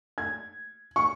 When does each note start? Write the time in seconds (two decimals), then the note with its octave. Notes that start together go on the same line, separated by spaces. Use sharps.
0.18 G#6
0.96 C#6